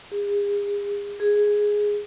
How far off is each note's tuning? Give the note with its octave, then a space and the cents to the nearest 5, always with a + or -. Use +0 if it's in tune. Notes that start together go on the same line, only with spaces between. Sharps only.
G#4 -40
G#4 +0